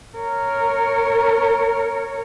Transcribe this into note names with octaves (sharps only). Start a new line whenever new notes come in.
A#4 C#5